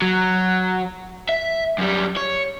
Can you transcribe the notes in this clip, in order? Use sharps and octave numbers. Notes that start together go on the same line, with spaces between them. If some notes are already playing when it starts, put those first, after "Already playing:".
F#3
E5
F#2 G3
C#5